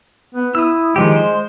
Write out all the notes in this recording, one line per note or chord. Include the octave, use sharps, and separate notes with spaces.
B3
E4 D#6 E6
D#3 F3 G#3 G4
C5